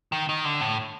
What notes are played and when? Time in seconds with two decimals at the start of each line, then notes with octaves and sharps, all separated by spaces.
0.12 D#3
0.29 D#3
0.45 D3
0.61 A2